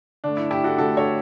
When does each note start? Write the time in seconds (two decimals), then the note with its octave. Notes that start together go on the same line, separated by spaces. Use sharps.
0.24 D3 A3 D4
0.37 E4
0.51 E4 G4
0.64 F#4 A4
0.78 D3 A3 F#4 A4
0.97 A4 C#5